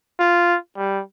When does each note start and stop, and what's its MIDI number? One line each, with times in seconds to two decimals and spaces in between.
0.19 0.57 65
0.77 1.01 55